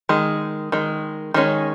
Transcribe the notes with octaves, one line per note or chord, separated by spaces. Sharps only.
D#3 G#3
D#3 G#3
D#3 G#3 C#4